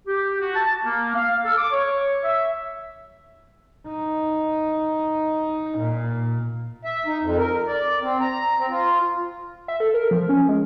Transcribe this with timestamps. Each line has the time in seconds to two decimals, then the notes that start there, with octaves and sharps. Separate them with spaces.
0.07 G4
0.40 F#4
0.55 A5
0.84 A#3
1.14 F5
1.44 A4
1.57 D6
1.71 C#5
2.24 E5
3.88 D#4
5.79 A#2
6.85 E5
7.06 D#4
7.21 F2
7.38 A#4
7.68 D5
8.02 C4
8.21 A#5
8.58 C4
8.70 F4
9.68 E5
9.80 A4
9.94 A#4
10.11 F3
10.29 C#4
10.49 G#3